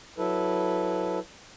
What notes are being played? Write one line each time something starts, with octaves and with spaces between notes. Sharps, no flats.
F#3 E4 A4 B4